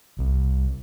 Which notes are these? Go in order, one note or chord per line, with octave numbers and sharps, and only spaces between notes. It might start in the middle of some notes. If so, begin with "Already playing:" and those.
C2